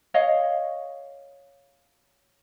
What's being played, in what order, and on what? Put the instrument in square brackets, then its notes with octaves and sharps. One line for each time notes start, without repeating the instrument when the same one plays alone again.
[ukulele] C#5 D#5 F5